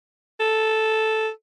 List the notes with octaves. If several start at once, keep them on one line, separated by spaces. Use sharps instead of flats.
A4